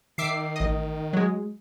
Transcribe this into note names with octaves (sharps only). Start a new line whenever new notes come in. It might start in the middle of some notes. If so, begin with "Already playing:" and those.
D#3 E5 D6 C7
A1 D#5
F#3 G#3